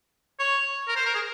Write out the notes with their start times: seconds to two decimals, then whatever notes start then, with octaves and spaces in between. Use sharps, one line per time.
0.39 C#5
0.88 A#4
0.96 C5
1.06 A#4
1.14 G#4